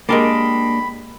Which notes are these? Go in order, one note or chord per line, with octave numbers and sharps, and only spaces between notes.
G#3 A#3 D4 G4 A#4 D5 B5